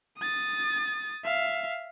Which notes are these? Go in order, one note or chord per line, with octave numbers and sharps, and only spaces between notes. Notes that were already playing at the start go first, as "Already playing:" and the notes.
D#6 A6
E5 F5